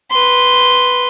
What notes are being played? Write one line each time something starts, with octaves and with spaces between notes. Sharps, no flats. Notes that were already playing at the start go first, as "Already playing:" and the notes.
B4 C6